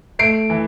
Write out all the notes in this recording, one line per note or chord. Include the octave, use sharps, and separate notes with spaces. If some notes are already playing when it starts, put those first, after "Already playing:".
A3 C7 D7
E3